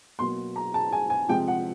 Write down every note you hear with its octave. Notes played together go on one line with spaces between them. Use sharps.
B2 F#3 A#3 C6
A#5
A5
G#5
G#5
C3 F3 G#3 G5
F#5